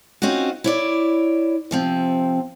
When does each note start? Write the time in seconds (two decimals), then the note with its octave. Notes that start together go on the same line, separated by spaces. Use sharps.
0.22 C4 C#4 D#4 F4 F#4
0.64 E4 C#5 D5
1.71 C3 F3 C4